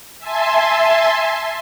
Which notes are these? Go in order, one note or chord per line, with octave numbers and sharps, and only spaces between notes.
E5 G#5 A5 C6